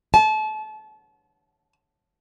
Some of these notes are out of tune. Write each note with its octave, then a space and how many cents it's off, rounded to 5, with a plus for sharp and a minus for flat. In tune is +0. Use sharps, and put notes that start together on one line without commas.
A5 -30